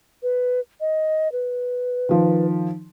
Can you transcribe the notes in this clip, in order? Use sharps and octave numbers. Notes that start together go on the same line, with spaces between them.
B4
D#5
B4
D#3 F3